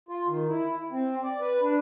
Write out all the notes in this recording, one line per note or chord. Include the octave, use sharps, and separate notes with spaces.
F4
D#3
E4
C4
D5
B4
D4